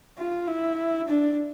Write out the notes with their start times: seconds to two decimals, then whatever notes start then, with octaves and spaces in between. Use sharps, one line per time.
0.18 F4
0.48 E4
1.08 D4